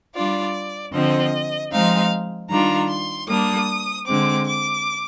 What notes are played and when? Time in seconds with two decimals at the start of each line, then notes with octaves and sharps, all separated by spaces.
0.15 G3 D4 F4 D5
0.93 D3 F3 C4 D#5
1.71 F3 G#3 C4 D#4 F5
2.50 D#3 G3 D4 F4 A#5
2.90 C6
3.29 G3 A#3 D4 D#6
4.07 D3 G#3 C4 D6
4.47 D6